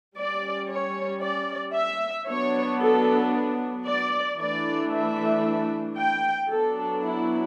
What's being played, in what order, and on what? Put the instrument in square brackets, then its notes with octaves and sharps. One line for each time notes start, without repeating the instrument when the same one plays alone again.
[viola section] G3 C#4 D5
C#5
D5
E5
F#3 B3 D4 C#5
A4
D5
E3 A3 D4 D5
E5
G5
F#3 B3 D4 A4
E4